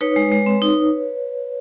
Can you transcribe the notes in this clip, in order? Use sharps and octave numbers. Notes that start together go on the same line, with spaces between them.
D#4 B4 C#5
G#3
G#3
C4
D#4